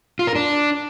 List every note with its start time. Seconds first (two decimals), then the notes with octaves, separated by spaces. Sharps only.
0.19 F4
0.27 A#4
0.36 D4